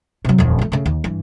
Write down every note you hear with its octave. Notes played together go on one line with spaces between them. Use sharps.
C3 F#3
D#1 F2
F3 A3
C#3 A3
D#2
G2 E3